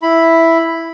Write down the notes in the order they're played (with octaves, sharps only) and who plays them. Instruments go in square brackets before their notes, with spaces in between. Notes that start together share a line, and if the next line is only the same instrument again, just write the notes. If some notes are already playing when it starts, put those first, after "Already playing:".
[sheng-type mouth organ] E4 B5